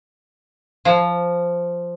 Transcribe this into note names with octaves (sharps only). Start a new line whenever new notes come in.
F3